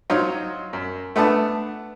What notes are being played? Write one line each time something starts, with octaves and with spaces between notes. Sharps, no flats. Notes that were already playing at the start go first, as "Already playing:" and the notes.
F#3 D#4 F4 C5 C#5 D#5
F#2
A3 B3 D4 A5